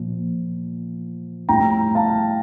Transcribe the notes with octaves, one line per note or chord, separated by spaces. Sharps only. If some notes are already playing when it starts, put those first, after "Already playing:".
Already playing: A#2 F3
A2 G3 G5 A#5
F5 A5